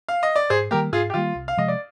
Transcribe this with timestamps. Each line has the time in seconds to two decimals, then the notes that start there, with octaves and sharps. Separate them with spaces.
0.09 F5
0.23 D#5
0.36 D5
0.50 G#2 G#4 C5
0.71 D#3 G3 A#3 G4 A#4
0.92 G#2 F4 G#4
1.10 G4
1.14 D#3 G3 A#3 F4
1.35 C2
1.48 F5
1.57 C3 F3 G#3 D#5
1.68 D5